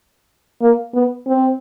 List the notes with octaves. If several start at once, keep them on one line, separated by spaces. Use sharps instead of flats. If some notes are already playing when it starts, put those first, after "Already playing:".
A#3
B3
C4